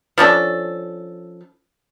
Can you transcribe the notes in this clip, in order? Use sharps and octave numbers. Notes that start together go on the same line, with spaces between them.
F3 C#4 D4 A4